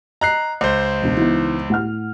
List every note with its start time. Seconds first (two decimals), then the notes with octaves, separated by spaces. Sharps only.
0.21 D#5 A#5 F#6 C7
0.61 C#2 C5
1.02 E1 D4
1.17 E3 B3 D#4
1.70 A2 F#5 F6